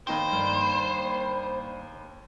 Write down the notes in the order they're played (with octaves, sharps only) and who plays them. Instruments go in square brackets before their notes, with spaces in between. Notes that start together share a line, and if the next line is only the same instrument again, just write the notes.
[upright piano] D#2 D#4 G5 [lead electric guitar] C5 [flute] B5
[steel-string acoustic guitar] G2 A#3 D5